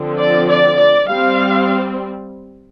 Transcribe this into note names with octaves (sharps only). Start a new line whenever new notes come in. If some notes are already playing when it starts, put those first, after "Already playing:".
Already playing: D3 F3 C4
D5
D5
D5
G3 C4 F5